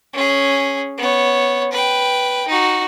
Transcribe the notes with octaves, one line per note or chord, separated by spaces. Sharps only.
C#4 G#4
B3 C#5
B4 G5
D#4 F#4